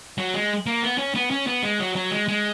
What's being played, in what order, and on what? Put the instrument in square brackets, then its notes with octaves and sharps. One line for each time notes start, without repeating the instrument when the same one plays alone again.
[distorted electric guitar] F#3
G#3
A#3
B3
C#4
B3
C#4
B3
G#3
F#3
F#3
G#3
G#3